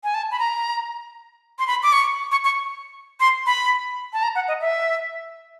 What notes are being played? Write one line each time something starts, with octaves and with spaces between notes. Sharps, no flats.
G#5
A5
B5
A#5
C6
B5
D6
C#6
C#6
C#6
C6
B5
A5
A#5
F#5
D#5
E5